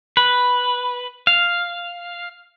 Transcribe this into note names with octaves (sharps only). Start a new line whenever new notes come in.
B4
F5